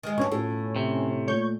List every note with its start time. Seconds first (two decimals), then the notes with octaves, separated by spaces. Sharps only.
0.03 D#3 G#3
0.18 D2 G2 B2 C#4 C#6
0.32 A2 F4 A4
0.76 C3
1.28 A#2 A3 C#5 C#6 G6